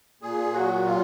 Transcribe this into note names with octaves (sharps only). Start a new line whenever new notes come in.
A#2 G#4
F#3 F#4
C3 F4